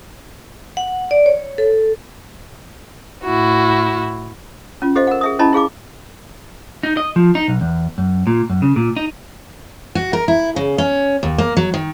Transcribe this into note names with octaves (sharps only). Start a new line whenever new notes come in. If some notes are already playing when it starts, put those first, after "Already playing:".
F#5
D5
C#5
A4
A2 E4 F#4
C#4 F4
G4 A4 C5 D#5 F5
A#4 F#5
G#4 E5 D#6
C#4 E4 D#5 A5 B5
E4 G#4 F5 D6
D#4
D#5
F3
D#4
B1
E2
F#2
A#2
F#2
C#3
A#2
D#4
F#4
A#4
E4
C#3
C#4
D#2
A#3
F#3
D#3